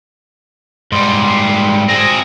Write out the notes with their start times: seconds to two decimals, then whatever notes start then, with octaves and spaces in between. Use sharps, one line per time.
0.92 G#2 G3 C6
1.89 C4 G#4 A#6